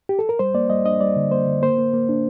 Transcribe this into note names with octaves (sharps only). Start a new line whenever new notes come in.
G4
A4
A#4
G3 C5
A#3 D5
G3 D#5
D4 D#5
G3 D5
D3
A#3 C5
D3
A#3 C5
A#3
A#3
D4